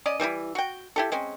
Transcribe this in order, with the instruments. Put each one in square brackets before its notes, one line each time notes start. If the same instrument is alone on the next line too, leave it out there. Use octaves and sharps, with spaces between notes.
[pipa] C#4 D5 D#5
E3 G3 D#4 E4
F#4 G5
E4 G4 A4
G#3 C4 C#4